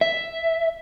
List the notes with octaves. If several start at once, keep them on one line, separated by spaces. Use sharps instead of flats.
E5